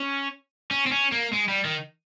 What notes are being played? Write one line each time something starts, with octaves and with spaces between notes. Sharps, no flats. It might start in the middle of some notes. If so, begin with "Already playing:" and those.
Already playing: C#4
C#4
C4
C#4
A#3
G#3
G3
D#3